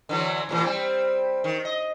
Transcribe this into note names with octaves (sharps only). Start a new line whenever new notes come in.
D3 E3 F#3
A2 C3 E3
G3 C4
D#3
D#5